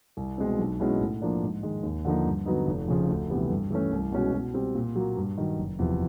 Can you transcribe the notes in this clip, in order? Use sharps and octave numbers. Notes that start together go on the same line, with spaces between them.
C2
B2 G#3 C4
B1
B2 G#3 C#4 E4
A2
F3 A#3 D4
G#2
D#3 G#3
D#2
D3 F3 A#3 D#4
G2
D3 F#3 B3 D#4
F1
F2 C#3 F3
D2
C3 E3 G3 B3
G2
E3 A3 C#4
C2
B2 G#3 C#4 F#4
B2
G3 C4
A#2
F#3 A#3
G2
D#3 F#3
F#1
E2 C3 F3